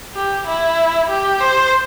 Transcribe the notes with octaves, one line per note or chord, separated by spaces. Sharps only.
G4
E4
G4
C5